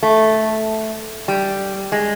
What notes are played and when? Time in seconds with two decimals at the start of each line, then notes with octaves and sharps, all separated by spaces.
0.03 A3
1.28 G3
1.92 G#3